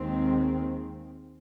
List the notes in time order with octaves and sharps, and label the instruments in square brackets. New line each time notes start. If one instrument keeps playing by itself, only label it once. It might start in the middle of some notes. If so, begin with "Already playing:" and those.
Already playing: [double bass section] D#2 D#3 G#3 C4